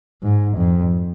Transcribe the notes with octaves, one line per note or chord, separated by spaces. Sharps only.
G#2
F2